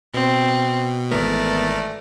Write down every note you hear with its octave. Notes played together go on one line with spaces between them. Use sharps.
B2 C4
G#1 E3 A3 B3 A#4 D5